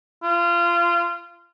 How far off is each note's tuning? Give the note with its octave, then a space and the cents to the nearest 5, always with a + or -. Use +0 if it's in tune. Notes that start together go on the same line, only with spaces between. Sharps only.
F4 -25